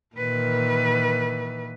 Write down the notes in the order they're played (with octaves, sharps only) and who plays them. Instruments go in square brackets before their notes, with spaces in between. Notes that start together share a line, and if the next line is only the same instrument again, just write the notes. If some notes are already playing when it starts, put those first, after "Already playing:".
[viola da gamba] A#2 D#3 E3 [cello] B4